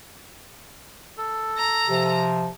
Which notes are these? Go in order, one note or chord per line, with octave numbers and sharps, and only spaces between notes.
A4
A#5
C3 F3